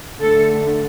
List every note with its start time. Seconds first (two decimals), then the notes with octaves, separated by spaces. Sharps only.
0.19 D3 A3 A4